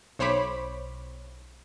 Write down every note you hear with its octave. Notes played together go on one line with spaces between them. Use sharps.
B1 C5 C#5 B5 D6